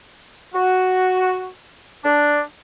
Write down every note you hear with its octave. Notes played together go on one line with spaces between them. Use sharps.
F#4
D4